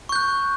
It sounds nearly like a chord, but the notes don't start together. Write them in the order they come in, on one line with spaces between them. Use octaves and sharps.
C#6 G6 F#6